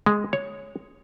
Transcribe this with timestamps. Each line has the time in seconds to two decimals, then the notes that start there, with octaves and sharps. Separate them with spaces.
0.06 G#3
0.33 C#5